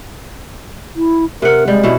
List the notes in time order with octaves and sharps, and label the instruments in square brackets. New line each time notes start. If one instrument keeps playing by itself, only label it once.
[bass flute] E4
[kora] C3 F#5 [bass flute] A#4
[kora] G3 [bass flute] G#3
[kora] B2 C#4 E4